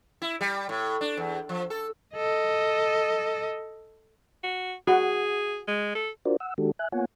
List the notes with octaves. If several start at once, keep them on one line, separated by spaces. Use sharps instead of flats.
E4
G3
A2
D4
E2
F3
A4
A4 D#5
F#4
F#4 G#4 F#5
G#3
A4
D4 F4 F#4 A#4 C5 D5
F#5 E6
D#3 G#3 D4 F#4 G4 A4
E5 G#5 F#6
A#3 B3 F4 C#5 F#5 G#5